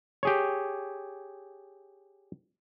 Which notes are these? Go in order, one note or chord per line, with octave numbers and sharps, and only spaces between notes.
G4 G#4 C#5